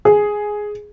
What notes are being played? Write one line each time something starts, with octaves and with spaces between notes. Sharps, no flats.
G#4